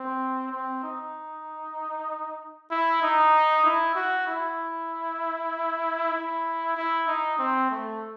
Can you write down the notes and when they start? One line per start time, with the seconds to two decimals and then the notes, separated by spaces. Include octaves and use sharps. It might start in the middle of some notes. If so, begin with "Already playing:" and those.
Already playing: C4
0.52 C4
0.84 D#4
2.71 E4
3.02 D#4
3.65 E4
3.95 F#4
4.27 E4
6.13 E4
6.77 E4
7.07 D#4
7.39 C4
7.71 A3